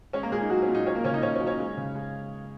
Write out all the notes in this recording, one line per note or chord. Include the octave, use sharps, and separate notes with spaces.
G#3 C#4 C#5
A#3 A#4
A#2 G#3 G#4
D#4
F#3 G#3 F#4
C#4
A#2
D#4
F#3 C#4 C#5
A#3 A#4
C#3 C#4 C#5
D#4 D#5
C#3 C#4 C#5
C#4 C#5
F#3
C#4 C#5
G#3
C#3
G#3